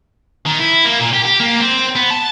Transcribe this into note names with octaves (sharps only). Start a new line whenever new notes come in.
D#3
E4
A#3
A#2
G4
G4
A#3
C4
B3
A5